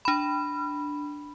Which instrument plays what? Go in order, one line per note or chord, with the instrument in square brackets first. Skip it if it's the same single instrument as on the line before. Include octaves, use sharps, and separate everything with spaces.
[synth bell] D4 B5